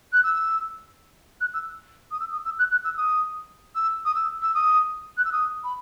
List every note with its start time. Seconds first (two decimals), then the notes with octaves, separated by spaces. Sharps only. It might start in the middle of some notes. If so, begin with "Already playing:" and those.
0.13 F#6
0.23 E6
1.41 F#6
1.54 E6
2.11 D#6
2.20 E6
2.32 D#6
2.45 E6
2.59 F#6
2.71 F#6
2.84 E6
2.97 D#6
3.75 E6
4.05 D#6
4.15 E6
4.42 E6
4.54 D#6
5.17 F#6
5.25 E6
5.32 D#6
5.64 B5